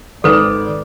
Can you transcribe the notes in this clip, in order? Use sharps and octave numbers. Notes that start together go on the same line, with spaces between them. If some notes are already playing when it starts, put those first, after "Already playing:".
G#1 A4 B4 D5